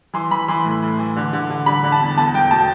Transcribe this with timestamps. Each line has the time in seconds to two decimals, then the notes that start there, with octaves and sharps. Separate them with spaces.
0.14 E3 C6
0.31 E3 B5
0.48 E3 C6
0.65 A2
0.83 A2
0.98 E3
1.16 D3
1.33 D3
1.50 D3
1.66 D3 B5
1.84 D3
1.92 A5
2.01 E2
2.18 E2 A5
2.35 E2 G5
2.51 B2 A5